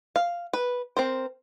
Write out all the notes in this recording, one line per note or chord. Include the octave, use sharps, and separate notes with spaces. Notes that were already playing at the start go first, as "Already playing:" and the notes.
F5
B4
C4 A#4 C5